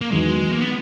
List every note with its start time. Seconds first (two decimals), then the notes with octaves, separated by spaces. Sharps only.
0.01 A#3
0.11 E2 D#3 F#3 G#3 B3 D#4
0.53 A#3
0.61 B3